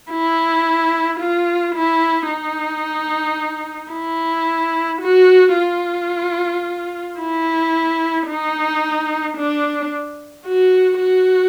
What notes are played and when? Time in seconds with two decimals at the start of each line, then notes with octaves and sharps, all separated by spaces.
0.12 E4
1.20 F4
1.75 E4
2.29 D#4
3.92 E4
5.02 F#4
5.56 F4
7.20 E4
8.28 D#4
9.37 D4
10.46 F#4
11.00 F#4